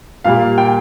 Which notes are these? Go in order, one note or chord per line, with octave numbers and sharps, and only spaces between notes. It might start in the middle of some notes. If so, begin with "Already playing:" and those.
A#2 G3 A#3 F5
G5